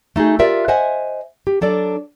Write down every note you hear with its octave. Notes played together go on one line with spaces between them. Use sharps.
A3 D#4 F#4 G#4
F4 G4 A#4 D5 E5
C5 D#5 E5 F#5 G#5
G4
F#3 D4 A4 D5